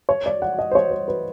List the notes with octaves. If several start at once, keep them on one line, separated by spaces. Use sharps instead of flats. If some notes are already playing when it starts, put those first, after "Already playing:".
C#5
D5
F#5
D#5
C5
C#5
C5
B4